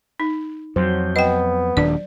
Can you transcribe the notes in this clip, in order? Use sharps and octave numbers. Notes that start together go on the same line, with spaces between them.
D#4
F2 F#3 C5
B3 D#5 G5
D#1 D#2 D4 D5